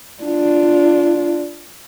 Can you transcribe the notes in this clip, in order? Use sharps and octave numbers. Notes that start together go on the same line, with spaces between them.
D4 F4